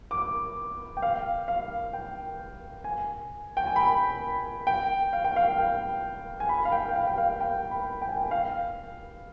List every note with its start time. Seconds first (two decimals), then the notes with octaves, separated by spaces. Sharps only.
0.11 D6
0.97 G5
1.02 F5
1.48 F5
1.93 G5
2.84 G#5
3.57 G5
3.66 G#5
3.76 B5
4.67 G5
5.13 F5
5.25 G5
5.36 F5
5.59 G5
6.40 G#5
6.49 B5
6.65 F5
6.72 G5
6.89 G5
6.95 F5
7.07 G5
7.18 F5
7.40 G5
7.71 B5
8.02 G5
8.09 G#5
8.17 G5
8.31 F5